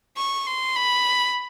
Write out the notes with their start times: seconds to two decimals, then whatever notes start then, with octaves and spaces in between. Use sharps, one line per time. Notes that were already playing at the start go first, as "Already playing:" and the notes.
0.17 C#6
0.46 C6
0.76 B5